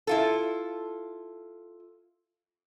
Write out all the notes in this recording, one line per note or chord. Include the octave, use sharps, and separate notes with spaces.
E4 F4 A4